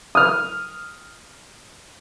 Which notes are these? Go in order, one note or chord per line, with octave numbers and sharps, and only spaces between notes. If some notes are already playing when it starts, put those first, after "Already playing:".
D#6 F6